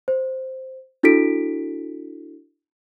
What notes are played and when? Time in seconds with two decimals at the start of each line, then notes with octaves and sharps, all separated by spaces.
0.08 C5
1.03 D4 E4 F#4 A4 B6 D7